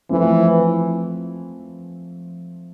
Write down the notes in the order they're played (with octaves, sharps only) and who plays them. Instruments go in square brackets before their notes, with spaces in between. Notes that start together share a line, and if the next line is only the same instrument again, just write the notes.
[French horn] E3 [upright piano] F3 A3 C4